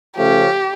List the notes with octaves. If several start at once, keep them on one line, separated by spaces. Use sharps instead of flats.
C#3 F3 A3 C#4 G4